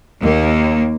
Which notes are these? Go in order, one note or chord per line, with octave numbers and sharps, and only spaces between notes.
D#2 A#3